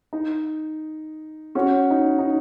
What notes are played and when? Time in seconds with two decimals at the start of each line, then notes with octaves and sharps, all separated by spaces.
0.13 D#4
1.55 C#4 F#4
1.91 D#4
2.19 D#4